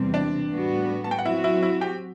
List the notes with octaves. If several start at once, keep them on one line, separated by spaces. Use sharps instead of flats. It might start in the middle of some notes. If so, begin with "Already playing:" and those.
Already playing: E2 C3 G3 C4
D4 D5
A2 G3 B3 F#4
A5
G5
F#5
F#3 C4 E4 F#4 E5
E4 E5
E4 E5
G4 G5